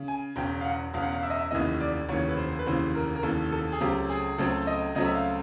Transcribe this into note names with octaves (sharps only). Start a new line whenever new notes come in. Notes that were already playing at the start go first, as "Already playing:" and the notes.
Already playing: C#3
G#5
E1 E2 C#3 G5
F5
F#5
E1 E2 C#3 F5
F#5
F5
E5
D#5
E5
F1 D#2 C#3 E3 D#5
D5
F1 D#2 C#3 E3 C#5
B4
C5
B4
F1 D#2 C#3 E3 C5
A#4
A#4
F1 D#2 C#3 E3 A4
A4
G#4
C#2 C#3 F#3 A3 C4 G4
G#4
C#2 C#3 F#3 A3 C4 A4
D#5
C#2 C#3 F#3 A3 C4 D#5
E5
F5